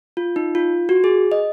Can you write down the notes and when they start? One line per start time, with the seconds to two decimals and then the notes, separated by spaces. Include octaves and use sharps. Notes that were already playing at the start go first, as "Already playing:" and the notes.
0.17 F4
0.36 D#4
0.55 F4
0.89 F#4
1.04 G#4
1.32 D#5